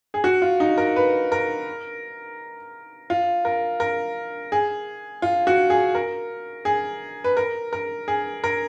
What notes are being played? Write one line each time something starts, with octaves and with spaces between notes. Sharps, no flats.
G#4
F#4
F4
D#4
A#4
B4
A#4
F4
A#4
A#4
G#4
F4
F#4
G#4
A#4
G#4
B4
A#4
A#4
G#4
A#4